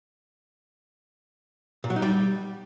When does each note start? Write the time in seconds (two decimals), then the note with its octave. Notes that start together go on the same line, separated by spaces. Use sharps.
1.84 A#2
1.90 F#3
1.96 D#4
2.02 G3